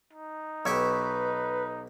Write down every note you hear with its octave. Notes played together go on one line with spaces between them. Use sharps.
D#4
B1 G4 B4 G5 C#6 E6 G#6